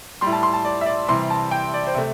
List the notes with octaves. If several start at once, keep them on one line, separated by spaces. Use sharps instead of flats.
A2 G3 C6
A5
C6
A5
D5
E5
D5
C3 E3 G3 C6
A5
G5
D5
C5
C3 A3